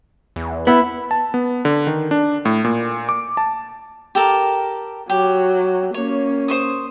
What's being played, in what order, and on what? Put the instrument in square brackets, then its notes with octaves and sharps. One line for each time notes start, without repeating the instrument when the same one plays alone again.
[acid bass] E2
[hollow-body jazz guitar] B3 [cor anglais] E4
[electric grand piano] A5
B3
D3
D#3
D4
A2
A#2
D6
A5
[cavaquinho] G4 A4 A#4
[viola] F#3 [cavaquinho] G4
[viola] A#3 C#4 [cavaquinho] C#5
[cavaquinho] C5 C#6 D#6